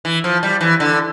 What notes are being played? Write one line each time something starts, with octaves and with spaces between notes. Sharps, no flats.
E3
F3
G3
E3
D3